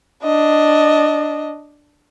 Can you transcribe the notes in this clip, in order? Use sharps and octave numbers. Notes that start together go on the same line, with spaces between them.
D4 D#5